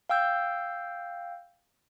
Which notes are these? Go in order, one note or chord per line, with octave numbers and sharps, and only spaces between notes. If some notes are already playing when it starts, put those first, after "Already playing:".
F5 G5 E6 G6